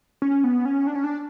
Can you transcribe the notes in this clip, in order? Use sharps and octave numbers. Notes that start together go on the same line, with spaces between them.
C#4
B3
C#4
D4
C#4
D4